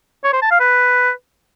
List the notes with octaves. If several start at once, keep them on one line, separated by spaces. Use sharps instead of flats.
C#5
C5
A5
F5
B4